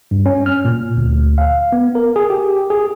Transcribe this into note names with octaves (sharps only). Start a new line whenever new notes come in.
G2
C#4
F6
A#2
D2
F5
B3
A#4
G#4
G4
G#4